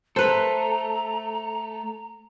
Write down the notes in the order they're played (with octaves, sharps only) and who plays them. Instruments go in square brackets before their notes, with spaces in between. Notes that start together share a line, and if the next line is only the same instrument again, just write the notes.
[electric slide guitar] A3 A4 [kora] B4 C5 [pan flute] A#5